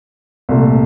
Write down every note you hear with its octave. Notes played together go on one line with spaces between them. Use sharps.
C2 A#2 A3